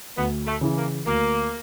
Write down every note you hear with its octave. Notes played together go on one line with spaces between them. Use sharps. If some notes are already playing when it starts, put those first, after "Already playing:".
D2 B3
A3
C#3 E3
A#3
D2 A#3